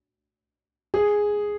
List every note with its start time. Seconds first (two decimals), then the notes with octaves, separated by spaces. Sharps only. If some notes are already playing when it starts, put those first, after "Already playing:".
0.94 G#4